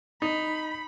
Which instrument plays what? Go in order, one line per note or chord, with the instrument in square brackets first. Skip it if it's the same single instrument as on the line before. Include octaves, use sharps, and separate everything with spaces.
[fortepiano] D#4 [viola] B5